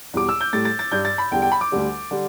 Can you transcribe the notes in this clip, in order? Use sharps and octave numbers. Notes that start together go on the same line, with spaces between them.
E2 B2 G3 D6
E6
G6
A2 G3 A6
A6
A6
G2 G3 G6
A6
B5
E2 D3 G3 G5
G5
B5
D6
D2 D3 G3
D3 G3